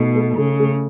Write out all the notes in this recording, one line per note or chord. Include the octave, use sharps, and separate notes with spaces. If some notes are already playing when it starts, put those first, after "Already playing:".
Already playing: B2 A3 D#4
A3
C#3 A3
A3